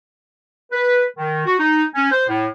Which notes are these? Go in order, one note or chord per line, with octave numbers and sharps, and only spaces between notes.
B4
D#3
F#4
D#4
C#4
C5
A2